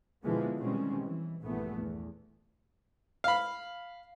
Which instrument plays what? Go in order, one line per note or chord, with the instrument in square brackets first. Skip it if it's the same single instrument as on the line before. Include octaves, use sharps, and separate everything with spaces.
[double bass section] B2 D3 E3 F3 G#3 B3
B2 D#3 G3 G#3 C4 C#4
E3
A#1 G2 A#2 E3 A3 B3
E2
[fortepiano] F5 B5